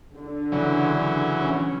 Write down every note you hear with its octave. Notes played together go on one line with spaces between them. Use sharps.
D3
C#3 E3 F#3
C#4